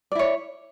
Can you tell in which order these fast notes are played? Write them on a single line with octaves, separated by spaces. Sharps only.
D5 E4 C#5